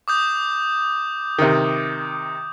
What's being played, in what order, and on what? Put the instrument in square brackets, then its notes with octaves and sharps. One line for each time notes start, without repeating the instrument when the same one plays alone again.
[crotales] D6 D#6 G6
[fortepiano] C3 D#3